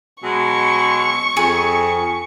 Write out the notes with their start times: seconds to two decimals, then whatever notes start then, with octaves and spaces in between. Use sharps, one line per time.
0.24 B2 F#3 G#3 C#6
1.37 F2 G#4